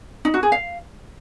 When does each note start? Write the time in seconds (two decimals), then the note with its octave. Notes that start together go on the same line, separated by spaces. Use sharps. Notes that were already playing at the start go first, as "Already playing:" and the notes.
0.25 D#4
0.34 F#4
0.43 G#4
0.52 F5